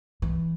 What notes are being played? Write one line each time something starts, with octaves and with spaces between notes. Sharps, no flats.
E3